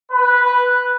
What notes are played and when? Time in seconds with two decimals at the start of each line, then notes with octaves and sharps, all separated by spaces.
0.12 B4